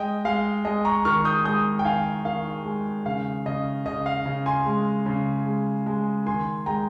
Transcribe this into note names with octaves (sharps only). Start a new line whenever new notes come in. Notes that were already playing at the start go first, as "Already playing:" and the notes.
Already playing: G#3 D#5 G5
G#3 F5
G#3 D#5
A#5 C#6
D#3 C#6 F6
D#6 G6
G#3 D#6 G6
G5
D#3 F5 G#5
D#3 F5
G#3
C#3 F5
C#3 D#5
C#3 D#5
F5
C#3
G#5 C6
G#3
C#3
G#3
G#3
D#3 G#5 C6
G#3 G5 A#5